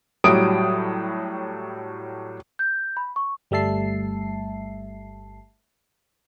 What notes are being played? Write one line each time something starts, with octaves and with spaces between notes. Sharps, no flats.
A2 F#3 G3 D#6 D7
G6
B5
C#6
G1 G3 A3 E5 A5 C7